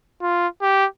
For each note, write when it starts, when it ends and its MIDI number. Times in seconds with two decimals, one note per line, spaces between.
0.22 0.48 65
0.61 0.86 67